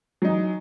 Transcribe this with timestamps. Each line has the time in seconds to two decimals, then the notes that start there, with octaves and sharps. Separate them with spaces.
0.22 F#3
0.25 D#4
0.27 E3